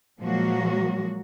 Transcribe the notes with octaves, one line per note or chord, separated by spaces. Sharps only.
A#2 F3 F#3 G#3 A#3 F#4